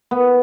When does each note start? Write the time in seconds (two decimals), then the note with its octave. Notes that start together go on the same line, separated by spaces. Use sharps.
0.11 B3